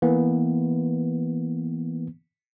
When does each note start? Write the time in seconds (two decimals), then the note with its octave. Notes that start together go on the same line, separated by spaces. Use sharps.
0.02 E3 A#3 B3